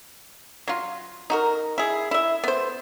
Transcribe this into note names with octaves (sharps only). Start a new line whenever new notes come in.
F#3 F4
D#4 F#4 A#4
E4 G#4
E4 E5
B3 C5